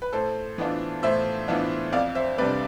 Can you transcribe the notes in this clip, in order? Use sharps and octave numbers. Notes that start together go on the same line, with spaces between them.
B4
A2 A4 C5
E3 B3 D4 F4
A2 C5 E5
E3 B3 D4 F4
F2 D5 F5
C5 E5
C3 G3 D4 B4 D5